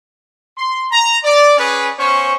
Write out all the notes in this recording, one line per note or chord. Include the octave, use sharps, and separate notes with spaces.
C6
A#5
D5
C#4 G#4 B4
B3 C#4 C5 C#6